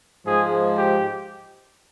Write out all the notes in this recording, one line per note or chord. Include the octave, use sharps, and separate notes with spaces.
G#2 F3 G#3 G#4
G4